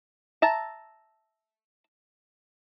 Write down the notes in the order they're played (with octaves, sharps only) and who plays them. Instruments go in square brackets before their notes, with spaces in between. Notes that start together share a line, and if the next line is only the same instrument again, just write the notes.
[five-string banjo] E5 A5 A#5